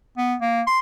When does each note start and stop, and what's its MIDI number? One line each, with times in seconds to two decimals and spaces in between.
0.17 0.34 59
0.41 0.62 58
0.67 0.79 84